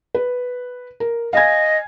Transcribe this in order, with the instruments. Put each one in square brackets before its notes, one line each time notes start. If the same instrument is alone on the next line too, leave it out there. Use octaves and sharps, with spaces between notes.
[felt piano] B4
A#4
[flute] D#5 [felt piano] F5 G#5 G#6